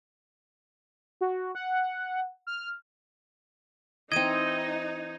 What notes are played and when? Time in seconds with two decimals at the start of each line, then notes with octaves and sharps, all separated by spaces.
1.21 F#4
1.55 F#5
2.47 F6
4.12 E3 C4 D#4 D#5 G#6 D#7